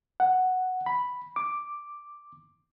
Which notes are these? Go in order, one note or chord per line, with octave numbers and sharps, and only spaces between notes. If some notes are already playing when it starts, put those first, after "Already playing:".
F#5
B5
D6